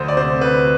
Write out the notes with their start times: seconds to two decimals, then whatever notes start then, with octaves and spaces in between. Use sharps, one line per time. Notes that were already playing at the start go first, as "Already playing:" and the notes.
Already playing: D2 C5
0.08 D5
0.17 C3 C5
0.41 D2 B4